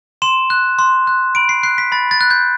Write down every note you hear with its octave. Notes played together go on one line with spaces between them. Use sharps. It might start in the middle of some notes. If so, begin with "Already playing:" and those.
C6 E7
F#6
C6
F#6
B5 D7
C7
F#6 C7
B6
B5 A6
A6
F#6
G6